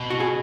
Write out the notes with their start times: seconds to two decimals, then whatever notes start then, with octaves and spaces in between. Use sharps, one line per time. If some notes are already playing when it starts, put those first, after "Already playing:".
Already playing: B2
0.10 F#4
0.20 G#4